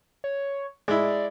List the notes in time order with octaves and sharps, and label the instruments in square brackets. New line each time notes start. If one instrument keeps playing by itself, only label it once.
[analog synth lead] C#5
[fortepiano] G#3 E4 [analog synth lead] D5